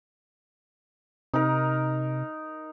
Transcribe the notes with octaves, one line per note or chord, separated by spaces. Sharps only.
C3 D#4 A#4